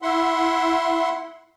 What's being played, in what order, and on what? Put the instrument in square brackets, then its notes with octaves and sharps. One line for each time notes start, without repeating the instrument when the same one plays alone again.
[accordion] E4 E5 F#5 C6